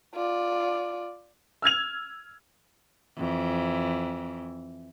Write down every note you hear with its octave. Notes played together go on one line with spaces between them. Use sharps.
F4 D5
E6 F6 G#6 F7
F2 E3